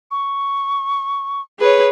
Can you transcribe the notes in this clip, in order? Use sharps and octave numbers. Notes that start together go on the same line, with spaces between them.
C#6
G#4 B4 C#5